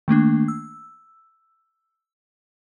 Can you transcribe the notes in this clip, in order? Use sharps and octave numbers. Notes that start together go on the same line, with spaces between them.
D#3 A3 A#3 D4
E6